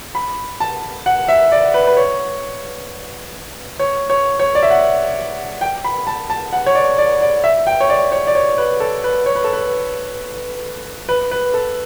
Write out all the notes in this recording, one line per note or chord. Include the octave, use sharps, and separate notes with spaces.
B5
A5
F#5
E5
D5
B4
B4
C#5
C#5
C#5
C#5
D5
E5
F#5
G5
B5
A5
A5
F#5
C#5
D5
D5
D5
E5
G5
C#5
D5
C#5
D5
C#5
B4
A4
B4
C#5
B4
A4
B4
B4
B4
A4